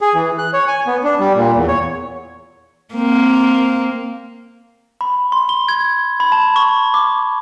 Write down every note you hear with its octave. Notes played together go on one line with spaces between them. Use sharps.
G#4
E3
F#6
C#5
G#5
B3
D4
G3
A#2
E2
C#5
A#3 C4
B5
C6
G7
G#6
B5
A5
C#6
D6